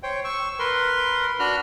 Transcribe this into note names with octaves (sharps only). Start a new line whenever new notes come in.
C5 C#5 G5
C#6 E6
A#4 B4 C6
D4 F#4 B5 F6 F#6